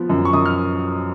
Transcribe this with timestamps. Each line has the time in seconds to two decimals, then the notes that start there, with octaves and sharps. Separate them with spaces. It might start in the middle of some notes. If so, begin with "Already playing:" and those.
Already playing: F3 B3
0.10 F#2
0.25 C#6
0.33 F#2 D#6
0.46 F6